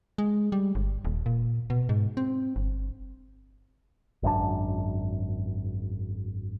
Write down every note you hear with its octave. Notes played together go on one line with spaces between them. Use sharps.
G#3
G3
G1
D#1
A#2
B2
G#2
C4
G1
G#1 F#2 A#2 D4